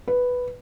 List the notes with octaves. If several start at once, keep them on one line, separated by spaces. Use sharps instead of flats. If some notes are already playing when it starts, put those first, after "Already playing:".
B4